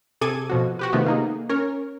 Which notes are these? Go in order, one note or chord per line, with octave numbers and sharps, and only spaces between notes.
C3 G#4 A4 D6 G#6 D#7
B2 F3 F#4
F#4 G4 B4
C3 D#3 F3 A3 B3
A#3 D#4 G#4
C#4 A#4 C#5